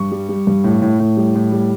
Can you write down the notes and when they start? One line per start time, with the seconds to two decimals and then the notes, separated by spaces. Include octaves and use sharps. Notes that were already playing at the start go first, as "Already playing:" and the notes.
Already playing: G2 C#6
0.12 G3
0.29 G3
0.47 G2
0.64 A2
0.82 A2
1.00 A2
1.17 G3
1.35 A2
1.52 G3